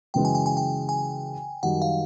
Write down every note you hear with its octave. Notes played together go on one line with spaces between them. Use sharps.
F#2 C#3 E3 G#3 G5
G#5
G5
G#5
G5
G#5
F#2 D#3 G3 F#5
F5